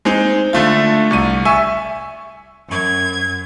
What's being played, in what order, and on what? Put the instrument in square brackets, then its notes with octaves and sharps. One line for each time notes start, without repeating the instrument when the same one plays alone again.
[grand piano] G#3 C4 D#4
D3 A3 F4
C2 C#6 D#7
E5 G#5 C#6 E6
[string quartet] F#2 G#6